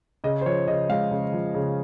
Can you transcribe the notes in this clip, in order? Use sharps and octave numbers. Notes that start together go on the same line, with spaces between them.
C#3 D#5
C5
F3 C#5
C#3 D#5
G#3 F5
C#3
F3
C#3